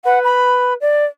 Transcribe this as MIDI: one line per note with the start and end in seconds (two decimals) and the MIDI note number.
0.05 0.73 71
0.05 0.19 78
0.24 0.74 83
0.81 1.06 74